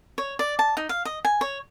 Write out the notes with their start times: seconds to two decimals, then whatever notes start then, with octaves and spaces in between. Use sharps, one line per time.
0.18 C#5
0.39 D5
0.59 A5
0.77 D#4
0.89 F5
1.05 D#5
1.25 G#5
1.41 C#5